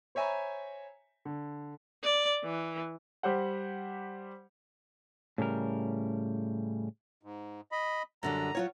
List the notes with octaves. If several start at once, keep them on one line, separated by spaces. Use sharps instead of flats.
C5 C#5 E5 G#5 A#5 B5
D3
D5
E3
G3 G4 C5 F#5
A2 C#3 G3 A#4
G#2
D#5 B5
F#2 D3 G3 A#5
F#3 F4 C#5